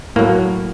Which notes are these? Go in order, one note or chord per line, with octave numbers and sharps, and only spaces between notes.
A2 F#3 A#3